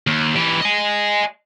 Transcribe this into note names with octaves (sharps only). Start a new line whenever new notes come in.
D#2
E3 G4
D#5 G#5